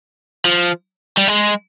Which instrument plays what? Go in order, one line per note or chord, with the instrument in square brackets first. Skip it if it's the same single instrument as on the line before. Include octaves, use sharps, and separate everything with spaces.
[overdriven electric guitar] F3
G3
G#3